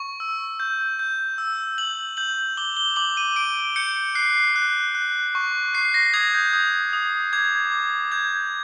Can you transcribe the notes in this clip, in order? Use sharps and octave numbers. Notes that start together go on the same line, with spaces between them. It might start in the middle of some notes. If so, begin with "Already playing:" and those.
Already playing: C#6
E6
G6
G6
E6
G6 F#7
G6 F#7
D6 G7
G7
D6 F#7
D#7
D6 D7
G6 C#7
F#6 C7
F#6
F#6
C#6
F#6 C7
A#6
D#6 G#6
G6
D#6
D#6
D6 G#6
D6
G6 G#6